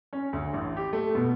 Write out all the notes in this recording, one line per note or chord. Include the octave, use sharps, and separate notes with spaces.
C#4
D2
A1
G4
A3
B2